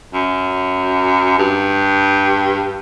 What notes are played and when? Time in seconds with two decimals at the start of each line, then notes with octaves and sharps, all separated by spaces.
0.14 F#2
1.39 G2